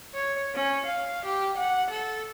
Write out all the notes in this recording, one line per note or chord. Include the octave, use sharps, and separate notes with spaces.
C#5
C#4
F5
G4
F#5
A4